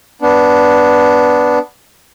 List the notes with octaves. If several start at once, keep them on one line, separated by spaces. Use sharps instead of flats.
B3 D4